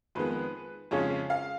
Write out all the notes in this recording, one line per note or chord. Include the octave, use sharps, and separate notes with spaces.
F2 D#3 G#3 B3 B4
F2 C#3 G#3 C#4 C#5
F5